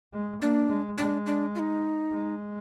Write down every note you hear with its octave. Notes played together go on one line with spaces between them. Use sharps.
G#3
A#3 D4
G#3
G#3 D4
D4
F4
D#4
G#3